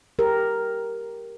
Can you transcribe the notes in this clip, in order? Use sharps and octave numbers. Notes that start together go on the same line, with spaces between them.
G4 A#4